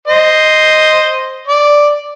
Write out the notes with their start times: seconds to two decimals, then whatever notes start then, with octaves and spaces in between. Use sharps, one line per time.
0.08 C5 D#5
1.48 D5